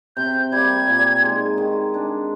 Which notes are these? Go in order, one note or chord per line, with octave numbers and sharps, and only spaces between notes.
C3 G6
G3 A#3 G#6
A#2
G#3 D#4
D#3
G#3 D4